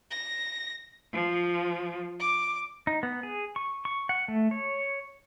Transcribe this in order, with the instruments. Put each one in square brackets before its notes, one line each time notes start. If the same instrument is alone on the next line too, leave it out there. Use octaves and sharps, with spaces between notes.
[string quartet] A#6
F3
D6
[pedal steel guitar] D#4
B3
G#4
C#6
C#6
F#5
A3
C#5